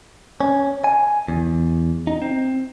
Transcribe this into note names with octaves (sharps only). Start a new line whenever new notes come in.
C#4
G#5
E2
D#4
C4